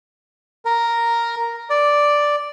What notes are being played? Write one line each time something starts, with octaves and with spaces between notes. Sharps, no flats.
A#4
D5